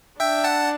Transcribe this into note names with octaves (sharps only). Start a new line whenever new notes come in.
D4 E5 G5
F#5 A5